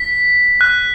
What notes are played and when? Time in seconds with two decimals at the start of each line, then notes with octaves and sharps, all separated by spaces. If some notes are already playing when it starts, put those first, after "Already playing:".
Already playing: B6
0.61 F#6